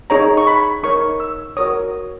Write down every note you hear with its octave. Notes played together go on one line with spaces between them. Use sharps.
D#4 G#4 C#5 A#5
C#6
B5
D#4 A#4 C#5 C#6
E6
F#4 A#4 C#5 D#6